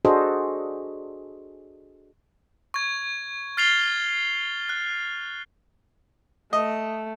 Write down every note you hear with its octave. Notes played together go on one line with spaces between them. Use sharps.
D4 F#4 G#4 A4 C5 D#5
C#6 G#6
F6 A6 C7 F7 G7
F#6
A3 D#5